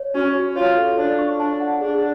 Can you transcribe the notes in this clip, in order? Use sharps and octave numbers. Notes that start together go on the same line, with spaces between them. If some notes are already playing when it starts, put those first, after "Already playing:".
Already playing: C#5
C#4 F#4
F#4
F4 C#5
A4
D4 C#5
C#6
D4 A5
F#5
D4 G#4